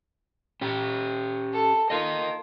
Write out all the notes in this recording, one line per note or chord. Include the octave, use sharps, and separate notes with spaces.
C#4 G4
A4
A#3 F4 A#4 D#5